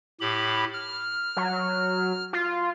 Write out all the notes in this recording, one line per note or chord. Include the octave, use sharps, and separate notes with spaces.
A2 G4 B5
F6
F#3
F4